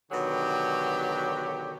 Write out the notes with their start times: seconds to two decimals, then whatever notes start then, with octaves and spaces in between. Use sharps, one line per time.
0.11 B2 D3 D#3 F#3 G4